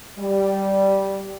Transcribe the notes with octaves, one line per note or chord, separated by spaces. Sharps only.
G3